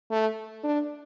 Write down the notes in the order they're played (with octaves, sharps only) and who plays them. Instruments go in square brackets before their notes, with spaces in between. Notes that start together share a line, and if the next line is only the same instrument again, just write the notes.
[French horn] A3
D4